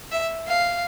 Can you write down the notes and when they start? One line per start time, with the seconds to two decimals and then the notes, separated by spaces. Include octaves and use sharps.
0.11 E5
0.47 F5